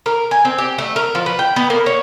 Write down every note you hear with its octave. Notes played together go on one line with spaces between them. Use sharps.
A#4
G#5
C4
G4
A3
A#4
F3
B4
G5
B3
A#3
C#5